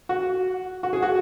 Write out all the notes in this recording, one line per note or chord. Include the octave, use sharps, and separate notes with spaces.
F#4
F#4
G#4
F#4